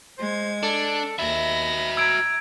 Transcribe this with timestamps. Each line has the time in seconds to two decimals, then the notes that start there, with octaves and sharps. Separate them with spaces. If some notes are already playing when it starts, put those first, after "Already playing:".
0.18 G#3 C5 G#6
0.63 D4 A4
1.19 D#2 F#4 E5 B5 A#6
1.97 A#5 E6 G#6 D7